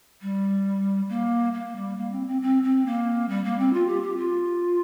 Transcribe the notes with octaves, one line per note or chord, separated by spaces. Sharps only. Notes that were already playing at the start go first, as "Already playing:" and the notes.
G3
A#3
A#3
G3
A#3
C4
C4
C4
C4
A#3
G3
A#3
C4
F4
G4
G4
F4